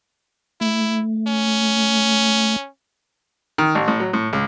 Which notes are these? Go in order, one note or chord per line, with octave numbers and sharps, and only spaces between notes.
A3 E4
C#4
D#3
A1
A2
F#3
A2
C#2